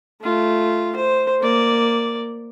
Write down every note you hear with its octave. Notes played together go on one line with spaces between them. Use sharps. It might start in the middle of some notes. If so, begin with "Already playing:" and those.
A3 F4
C5
A#3 D5